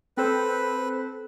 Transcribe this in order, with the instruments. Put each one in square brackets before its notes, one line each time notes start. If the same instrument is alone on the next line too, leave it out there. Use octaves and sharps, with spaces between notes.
[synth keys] C4 A4 C5 [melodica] B4